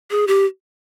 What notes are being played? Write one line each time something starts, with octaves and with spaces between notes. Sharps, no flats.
G#4
G4